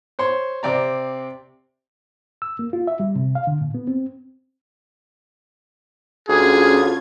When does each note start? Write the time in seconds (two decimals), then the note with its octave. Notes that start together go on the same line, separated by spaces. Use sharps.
0.19 C5 C#5 C6
0.63 C3 C4 D5 A#5
2.42 E6
2.59 A#3
2.73 F4
2.87 E5
3.00 G3
3.16 C3
3.35 F5
3.47 D3
3.61 A#2
3.74 B3
3.87 C4
6.29 D2 C#4 F4 G#4 G#6